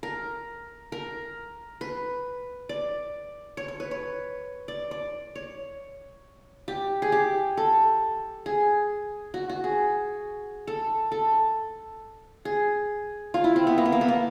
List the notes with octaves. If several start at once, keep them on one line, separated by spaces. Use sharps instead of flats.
A#4
A#4
B4
D5
C#5
C#5
B4
C#5
D5
D5
C#5
G4
G#4
G4
A4
G#4
F#4
F#4
G#4
A4
A4
G#4
F4
E4
C4
B3
A#3
B3
A#3
B3
A#3